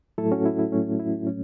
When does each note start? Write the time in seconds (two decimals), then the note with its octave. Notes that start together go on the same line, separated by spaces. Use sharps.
0.18 A2 F#3 A3 E4 A4
0.32 C#4 F#4
0.45 E4
0.59 E4
0.72 A2 F#3 A3 C#4
0.99 E4
1.27 A2 F#3 A3 C#4